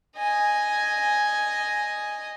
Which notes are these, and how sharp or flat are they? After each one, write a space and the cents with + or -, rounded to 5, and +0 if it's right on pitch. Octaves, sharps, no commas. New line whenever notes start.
D#5 +0 G#5 +0